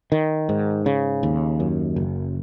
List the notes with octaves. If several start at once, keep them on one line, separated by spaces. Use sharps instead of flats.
D#3
G#2
C#3
D#2
F#2
F#1